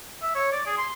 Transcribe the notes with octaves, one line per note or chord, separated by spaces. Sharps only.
E5
C#5
D5
G#4
C6